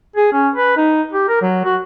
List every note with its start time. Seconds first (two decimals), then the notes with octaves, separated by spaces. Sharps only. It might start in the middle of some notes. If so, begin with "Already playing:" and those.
0.16 G#4
0.32 C#4
0.55 B4
0.77 D#4
1.13 G4
1.29 A#4
1.42 F#3
1.65 F#4